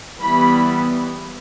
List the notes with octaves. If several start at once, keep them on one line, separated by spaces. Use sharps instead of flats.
E3 G3 B3 B5